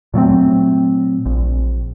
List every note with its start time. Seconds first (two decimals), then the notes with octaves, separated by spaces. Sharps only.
0.14 A#2 F#3 A3 C4
1.26 A#1